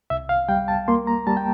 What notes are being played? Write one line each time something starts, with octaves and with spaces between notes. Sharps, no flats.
C2 E5
F5
G3 G5
A5
A#3 C6
A#5
G3 A5
G5